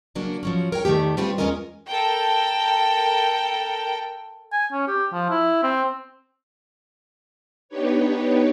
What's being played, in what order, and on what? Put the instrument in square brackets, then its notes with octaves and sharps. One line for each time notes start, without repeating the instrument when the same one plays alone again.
[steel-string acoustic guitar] C#3 F#3 A#3 D4
F3 F#3 C#4
A#4 C#5 G5
E2 D#3 E3 A3 G4
G3 A3 C4 F4 F#4 B4
E2 G#3 C#4 F4 A#4 D#5
[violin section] A4 A#4 G5
[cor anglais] G#5
C#4
G4
F3
E4
C4
[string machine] B3 D4 D#4 G4 B4 C#5